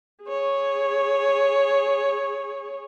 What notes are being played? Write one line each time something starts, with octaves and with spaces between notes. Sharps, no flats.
G#4 C#5